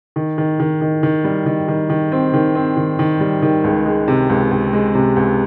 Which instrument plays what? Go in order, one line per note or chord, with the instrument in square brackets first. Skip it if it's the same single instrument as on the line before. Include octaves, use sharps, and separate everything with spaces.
[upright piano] D#3
D#3
D#3
D#3
D#3
G3
D#3
D#3
D#3
C4
D#3
C4
D#3
D#3
G3
D#3
C#2
G#3
C3
C#2
C#2
G#3
C3
C#2